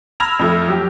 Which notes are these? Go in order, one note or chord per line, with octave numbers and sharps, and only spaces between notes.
B5 E6 F6 G#6 A#6 F7
F2 F3 A3
F#3 G4